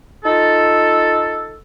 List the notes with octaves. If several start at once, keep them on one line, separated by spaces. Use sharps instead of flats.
D#4 F4 A4